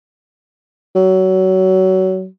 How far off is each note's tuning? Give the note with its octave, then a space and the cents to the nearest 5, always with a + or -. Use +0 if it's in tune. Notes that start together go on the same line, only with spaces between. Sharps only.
F#3 +25